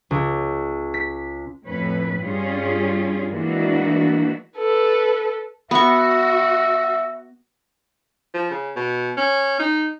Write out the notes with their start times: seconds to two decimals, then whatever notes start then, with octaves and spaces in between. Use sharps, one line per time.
0.11 C#2
0.94 B6
1.67 F2 A2 C#4 B4
2.21 G2 G3 C#4 F4 G#4
3.30 E3 G#3 A#3 B3 D4 F#4
4.57 A4 B4
5.71 B3 F#4 E5 C#6
8.34 F3
8.51 C#3
8.76 B2
9.17 C#4
9.59 D#4